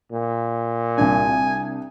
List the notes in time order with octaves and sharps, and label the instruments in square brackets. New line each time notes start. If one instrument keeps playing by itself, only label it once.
[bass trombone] A#2
[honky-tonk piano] C2 D4 [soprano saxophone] G#5